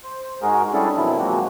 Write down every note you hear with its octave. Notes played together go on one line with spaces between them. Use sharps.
C5
G#2 G#3 F#4 G#4 A#4
G3 C#4 D4 E4 G#4 A4
F2 B2 D#3 F3 F#3 E4
C3 F3 G#3 A#3 C4 F#4